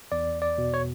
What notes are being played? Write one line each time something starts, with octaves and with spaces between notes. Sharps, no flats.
E2 D5
D5
B2
C#5